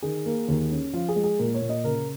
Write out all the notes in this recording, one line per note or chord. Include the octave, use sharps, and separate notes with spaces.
D#3 G#4
A#3
D#2
C#4
F3 F4
G#4
G#3
G#4
A#2 A#4
C#5
A#2
D#5
C#3 A#4